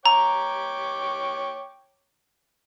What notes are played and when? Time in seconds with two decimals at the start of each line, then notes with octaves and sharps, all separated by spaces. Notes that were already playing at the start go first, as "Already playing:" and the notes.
0.06 C#5 G5 A#5 D6